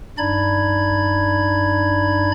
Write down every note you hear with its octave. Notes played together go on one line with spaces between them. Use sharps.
G2 D4 D#4 D5 B5 G#6